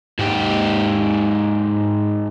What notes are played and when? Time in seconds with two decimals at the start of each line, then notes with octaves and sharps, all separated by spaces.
0.19 G#2 G4